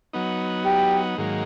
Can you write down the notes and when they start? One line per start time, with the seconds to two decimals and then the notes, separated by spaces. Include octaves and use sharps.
0.13 F#3 B3 D#4
0.65 G4
1.18 G#2 D#3 F#3 A#3